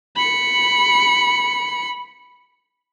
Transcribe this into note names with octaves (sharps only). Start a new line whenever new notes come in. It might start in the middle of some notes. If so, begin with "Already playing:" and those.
B5 C#7